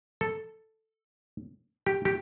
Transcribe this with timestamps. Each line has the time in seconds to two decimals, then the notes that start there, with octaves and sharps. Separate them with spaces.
0.21 A4
1.86 G4
2.05 G4